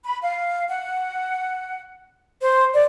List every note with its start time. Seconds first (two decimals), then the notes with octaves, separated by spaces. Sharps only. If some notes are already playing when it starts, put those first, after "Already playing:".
0.05 B5
0.22 F5
0.69 F#5
2.41 C5
2.74 D5